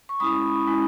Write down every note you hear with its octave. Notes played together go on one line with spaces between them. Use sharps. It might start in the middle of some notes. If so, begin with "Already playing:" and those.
C#6
G#3 C#4 E4 B5 D#6
G#3 C#4 E4